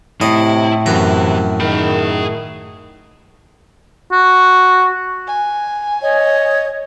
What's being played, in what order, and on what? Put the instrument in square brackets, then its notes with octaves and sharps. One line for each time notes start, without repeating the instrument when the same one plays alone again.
[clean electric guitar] A2 [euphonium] C3 [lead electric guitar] E4 [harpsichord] D#5
[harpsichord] F#2 A#5 [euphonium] C3 [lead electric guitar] E3
[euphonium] D#3 [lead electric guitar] G#4 B5
[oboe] F#4
[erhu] G#5
[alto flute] C#5 [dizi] D#5